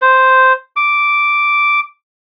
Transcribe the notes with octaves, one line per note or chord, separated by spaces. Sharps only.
C5
D6